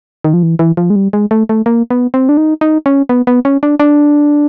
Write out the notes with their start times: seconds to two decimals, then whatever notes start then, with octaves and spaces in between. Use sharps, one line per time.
0.24 D#3
0.34 F3
0.43 E3
0.59 E3
0.77 F3
0.90 G#3
0.96 G3
1.13 G#3
1.31 A3
1.49 A3
1.66 A#3
1.90 B3
2.14 C4
2.29 D4
2.37 D#4
2.61 D#4
2.86 C#4
3.09 B3
3.27 B3
3.45 C#4
3.63 D4
3.80 D4